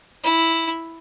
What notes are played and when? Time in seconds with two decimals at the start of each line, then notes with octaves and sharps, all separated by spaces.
0.24 E4